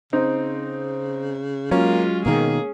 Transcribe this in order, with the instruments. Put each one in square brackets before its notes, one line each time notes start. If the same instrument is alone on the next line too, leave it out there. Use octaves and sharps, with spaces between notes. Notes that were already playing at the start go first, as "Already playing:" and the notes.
[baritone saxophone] C#3 [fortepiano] C4 D#4
[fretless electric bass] F#3 [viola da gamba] G#3 F4 [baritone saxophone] A#3 [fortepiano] C#4
[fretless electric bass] B2 D#3 [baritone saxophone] A#3 [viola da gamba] G#4